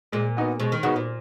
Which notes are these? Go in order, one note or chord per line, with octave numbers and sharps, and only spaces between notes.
A#2 G#3
B3 D#4 F#4
B2 G#3
D#3
C#3 B3 D#4 F#4
A#2